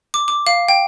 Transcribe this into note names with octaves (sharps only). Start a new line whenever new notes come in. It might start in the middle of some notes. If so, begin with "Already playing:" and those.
D6
D6
F5
G5